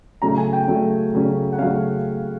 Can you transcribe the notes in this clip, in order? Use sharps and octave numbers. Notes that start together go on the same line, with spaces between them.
C#3 F#3 A3 C#4 A#5
G#5
G5
C#3 F#3 A3 C#4
C#3 F#3 A3 C#4
F#5
C#3 F#3 A3 C#4 F5